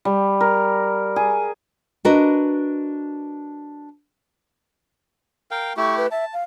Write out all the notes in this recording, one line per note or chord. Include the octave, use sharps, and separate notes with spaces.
G3
A#4
G#4
D4 F#4 A#4 B4 D#5
A#4 F5 G5
A3 E4 G4 C#6
B4
E5 A5
F5